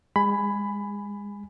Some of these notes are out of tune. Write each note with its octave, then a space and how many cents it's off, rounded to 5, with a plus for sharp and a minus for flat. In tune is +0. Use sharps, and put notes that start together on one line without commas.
G#3 -35 G#5 +0 B5 +15